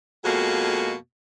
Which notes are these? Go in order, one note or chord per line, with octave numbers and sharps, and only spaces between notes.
F2 B2 G#3 A#3 F#4